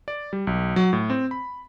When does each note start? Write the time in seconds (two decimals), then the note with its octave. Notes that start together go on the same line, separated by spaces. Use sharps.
0.08 D5
0.33 G3
0.47 B1
0.76 F#3
0.93 A2
1.10 C4
1.31 B5